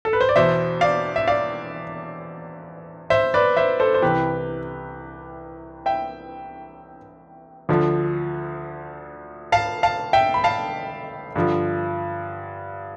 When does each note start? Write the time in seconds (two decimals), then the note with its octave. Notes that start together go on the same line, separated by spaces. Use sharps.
0.05 A4
0.13 B4
0.21 C5
0.29 D5
0.36 E2 B2 C5 E5
0.81 D5 F5
1.16 E5
1.28 D5 F5
3.10 C5 E5
3.34 B4 D5
3.57 C5 E5
3.80 A4 C5
3.94 C5
4.02 C2 C3 E3 G4 B4
5.86 E5 G5
7.69 D2 D3 F3
9.52 F5 A5
9.83 F5 A5
10.13 E5 G5
10.34 B5
10.44 F5 A5
11.36 G2 D3 F3